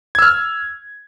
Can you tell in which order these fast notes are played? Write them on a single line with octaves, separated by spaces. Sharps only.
G#6 E6 F6